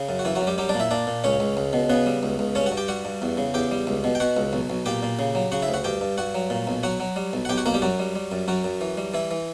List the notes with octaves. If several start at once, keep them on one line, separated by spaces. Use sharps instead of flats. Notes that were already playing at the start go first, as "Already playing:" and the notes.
Already playing: C#3
F#2
F#4
F#2 E3 E4
F#3 F#4
F#2
G3 G4
F#3 G3 G4
D4 D5
A#2
E4 E5
A#2 D4 D5
A#2
C#2 C#4 C#5
C#2
C#2
B2
C#3 B3 B4
G3
C#2
C#2
G2 C#4 C#5
F#4 F#5
G2
G4 G5
G3 F#4 F#5
G2
E2
C#3
E2 G4 G5
G3
C#2
B2
G5
B2 F#4 F#5
C#2
B1
B1
A#2 G4 G5
A#2
C#3
F#3
C#3 F#4 F#5
E4 E5
D2
F#4 F#5
G2 G4 G5
G2
G2 F#4 F#5
F#3
A#2
B1
F#3 F#4 F#5
F#3
G3
B1
F#5
B1 G4 G5
F#4 F#5
B1 A#3 A#4
G3 G4
F#2 F#3 F#4
G3
G3
F#2
F#2 F#3 F#4
F#2
E3
G3
E3 E4
E3